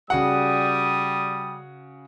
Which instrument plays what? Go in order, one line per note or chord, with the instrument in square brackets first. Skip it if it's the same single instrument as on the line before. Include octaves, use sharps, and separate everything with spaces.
[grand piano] C#3 F#4 F#5 [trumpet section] G3 D#6